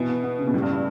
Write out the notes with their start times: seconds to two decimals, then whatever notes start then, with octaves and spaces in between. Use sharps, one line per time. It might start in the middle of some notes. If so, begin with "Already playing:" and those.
Already playing: B2 E3
0.09 B3
0.24 B3
0.39 C#3
0.48 B2
0.54 A2 G3
0.62 G2